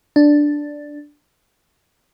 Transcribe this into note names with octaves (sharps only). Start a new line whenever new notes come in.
D4